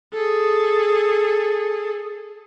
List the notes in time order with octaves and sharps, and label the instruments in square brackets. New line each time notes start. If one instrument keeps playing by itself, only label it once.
[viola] G#4 A4